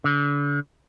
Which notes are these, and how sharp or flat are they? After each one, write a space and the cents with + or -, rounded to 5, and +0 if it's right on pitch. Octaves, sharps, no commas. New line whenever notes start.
D3 -35